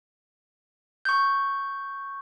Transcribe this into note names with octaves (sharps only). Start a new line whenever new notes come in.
C#6 G6